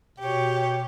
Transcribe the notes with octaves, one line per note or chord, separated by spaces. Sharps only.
B2 G4 C#5